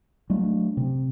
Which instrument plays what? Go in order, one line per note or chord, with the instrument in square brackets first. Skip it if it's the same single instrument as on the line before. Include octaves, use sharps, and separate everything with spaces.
[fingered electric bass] F#3 A3 D4
C3